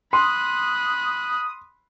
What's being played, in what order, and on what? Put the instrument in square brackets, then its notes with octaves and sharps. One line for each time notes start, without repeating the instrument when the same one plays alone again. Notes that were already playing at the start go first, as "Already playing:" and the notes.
[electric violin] B5 F#6 [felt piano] C6 [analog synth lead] D#6